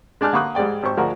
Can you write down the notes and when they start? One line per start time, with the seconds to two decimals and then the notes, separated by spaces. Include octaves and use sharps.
0.21 G#3 D4 G#5 A5 F6 F#6
0.33 D3 A#3 B5 C#6 D#6 F#6
0.55 G#2 G3 G#3 D5 G5
0.83 G#1 G4 C5 C#6
0.97 D2 F3 G#3 F#4 A#4